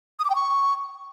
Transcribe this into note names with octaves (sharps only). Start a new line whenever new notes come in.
D#6
D6
G5
C#6